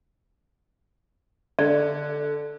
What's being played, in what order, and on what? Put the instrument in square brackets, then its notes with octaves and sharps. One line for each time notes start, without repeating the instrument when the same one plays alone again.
[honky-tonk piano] D3 [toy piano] D5